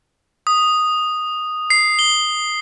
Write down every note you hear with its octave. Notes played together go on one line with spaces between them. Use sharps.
D#6
C7
G7